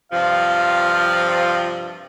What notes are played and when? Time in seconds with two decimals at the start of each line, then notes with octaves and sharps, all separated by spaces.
0.12 G2 C3 F3 F5